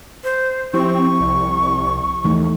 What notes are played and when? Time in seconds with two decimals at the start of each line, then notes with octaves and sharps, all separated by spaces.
0.24 C5
0.73 F3 C4 E4 G4 C#6
1.20 C2
2.24 D#2 E3 A3 D#4